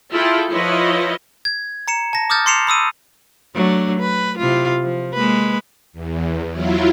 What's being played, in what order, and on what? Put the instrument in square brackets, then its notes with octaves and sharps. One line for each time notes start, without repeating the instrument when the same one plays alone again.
[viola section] E4 F4 G#4 A4 G5
F3 E4 F4 B4 C#5 D#5
[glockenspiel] G#6
A#5 C#7 E7
A5 A#6
D6 D#6 F6 G6 A6
C6 D6 C7 C#7 E7 F7
B5 D#6 E6 D#7
[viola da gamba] F#3 A3 D4
B4
C3 E4 F4
F3
G#3 A#3 B4
[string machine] E2
F#3 E4 F4